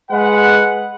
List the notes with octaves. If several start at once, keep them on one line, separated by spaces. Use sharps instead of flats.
G#3 B4 F#5